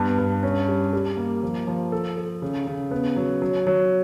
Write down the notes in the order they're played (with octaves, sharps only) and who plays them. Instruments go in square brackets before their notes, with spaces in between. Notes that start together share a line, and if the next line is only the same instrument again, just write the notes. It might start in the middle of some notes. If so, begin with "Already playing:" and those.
Already playing: [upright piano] G2 B3
G2
C#4
G3
G3
A#3
F3
F3
A4
A4
C#3
C#3
B3
F#3
F#3
F#3